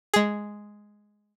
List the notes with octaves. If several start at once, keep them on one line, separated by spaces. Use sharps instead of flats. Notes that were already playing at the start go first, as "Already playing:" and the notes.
G#3 G#4